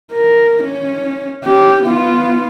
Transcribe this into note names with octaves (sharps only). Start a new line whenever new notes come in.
A#4
C#4
C#4 G4
B3 F4